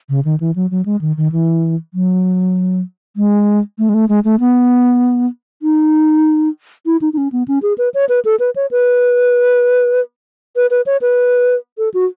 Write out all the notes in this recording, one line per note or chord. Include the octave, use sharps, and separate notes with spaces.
C#3
D#3
E3
F#3
F#3
G#3
D#3
D#3
E3
F#3
G#3
A3
G#3
A3
G#3
A3
B3
D#4
E4
D#4
D#4
C#4
B3
C#4
G#4
B4
C#5
B4
A4
B4
C#5
B4
B4
B4
C#5
B4
A4
F#4